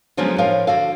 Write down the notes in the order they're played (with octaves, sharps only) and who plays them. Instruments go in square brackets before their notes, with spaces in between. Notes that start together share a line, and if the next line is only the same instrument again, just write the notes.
[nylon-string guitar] D3 F3 F#3 G#3 B3 C#4
A2 F3 A#4 C#5 F5
D3 F#4 A4 F5